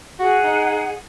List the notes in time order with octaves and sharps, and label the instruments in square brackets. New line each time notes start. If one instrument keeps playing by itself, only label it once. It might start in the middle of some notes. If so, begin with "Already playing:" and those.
[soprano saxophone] F#4 [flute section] G#4 F#5
[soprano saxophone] D#4